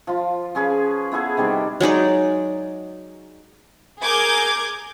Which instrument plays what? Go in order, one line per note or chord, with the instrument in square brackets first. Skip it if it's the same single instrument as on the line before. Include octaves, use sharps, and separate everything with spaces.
[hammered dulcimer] F3 F4
F3 C#4 G#4 B4
B3 E4 G#4 A4
C3 D#3 G3 D4
[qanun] F#3 G#3 D#4 D5
[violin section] G#4 A#4 A#5 D6 G6 G#6